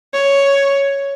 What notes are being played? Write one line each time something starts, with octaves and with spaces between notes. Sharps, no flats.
C#5